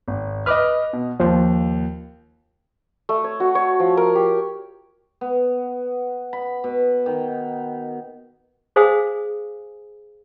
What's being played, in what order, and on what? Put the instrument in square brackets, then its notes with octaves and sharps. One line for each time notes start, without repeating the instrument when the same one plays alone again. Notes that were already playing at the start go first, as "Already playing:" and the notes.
[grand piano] G#1
[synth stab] B4 [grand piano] D#5 D6 F6
[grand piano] B2
[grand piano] D#2 [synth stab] F3
[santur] A3
C#5
F#4
C#5
F3
A#4
G4
[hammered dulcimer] B3
B5
B2
D#3
[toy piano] G#4 C5 F5 G#5 D#6